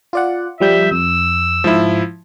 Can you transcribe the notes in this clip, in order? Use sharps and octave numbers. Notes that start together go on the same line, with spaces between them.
F4 D5 F#5
F3 G3 E5 G6
F2 E6
G#2 F3 E4